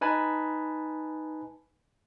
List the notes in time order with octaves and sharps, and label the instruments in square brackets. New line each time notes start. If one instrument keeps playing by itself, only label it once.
[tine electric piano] D#4 B4 G#5 A5 B5